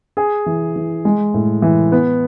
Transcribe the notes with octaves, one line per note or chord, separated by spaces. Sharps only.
G#4
E3
E3
G#3
A2
E3
B3